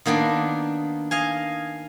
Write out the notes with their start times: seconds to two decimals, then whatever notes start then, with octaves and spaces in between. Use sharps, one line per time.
0.06 D#3 A#3 B3 D4
1.11 D#5 F5 G#5